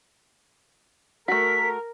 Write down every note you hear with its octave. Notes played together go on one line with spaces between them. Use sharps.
A3 F#4 A#4 B6